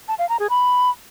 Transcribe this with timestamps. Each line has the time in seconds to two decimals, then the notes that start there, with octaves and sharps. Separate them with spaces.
0.08 A5
0.19 F5
0.29 A#5
0.40 G#4
0.50 B5